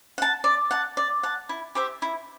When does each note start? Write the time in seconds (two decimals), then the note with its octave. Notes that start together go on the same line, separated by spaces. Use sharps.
0.18 F#5 A5
0.44 D5
0.71 F#5 A5
0.97 D5
1.23 F#5 A5
1.49 E4
1.75 G4 C5 E5
2.02 E4